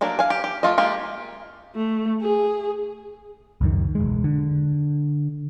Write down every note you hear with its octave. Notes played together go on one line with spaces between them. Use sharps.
F#3 A#3 D4 A#4
F5 G#5
G4
G4
A3 F4 D#5
G#3 A#3 F4 G4
A3
G#4
C#2 F#2 D#3
E1 G#3
D3